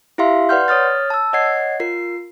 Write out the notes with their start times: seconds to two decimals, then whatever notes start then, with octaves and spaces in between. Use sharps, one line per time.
0.18 E4 G4 E5 F5 C6
0.49 B4 D5 F#5 C6 F6 G6
0.68 C#5 D#6 F6 A6
1.10 A5 E6
1.33 C#5 D#5 F#5 G#6 C7
1.80 F4 A#4 C7